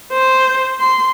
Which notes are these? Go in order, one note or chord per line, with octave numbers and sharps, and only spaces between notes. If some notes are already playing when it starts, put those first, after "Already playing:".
C5
C6